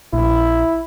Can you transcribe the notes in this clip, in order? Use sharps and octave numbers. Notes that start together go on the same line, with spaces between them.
A#1 E4